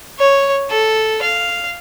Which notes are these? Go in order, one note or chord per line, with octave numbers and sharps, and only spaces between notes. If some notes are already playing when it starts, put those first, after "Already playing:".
C#5
A4
F5